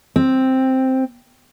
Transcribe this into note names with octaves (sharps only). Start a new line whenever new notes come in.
C4